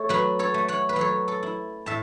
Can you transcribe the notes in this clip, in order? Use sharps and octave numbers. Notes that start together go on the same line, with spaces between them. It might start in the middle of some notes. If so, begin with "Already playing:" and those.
Already playing: A3 A4 C#5
F#3 F#4 B4
A4 C#5
A3
C#5 F#5
B4
F#3 A4 C#5
A4
E4
A2 E5 A5